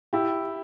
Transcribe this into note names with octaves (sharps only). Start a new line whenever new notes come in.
E4 G4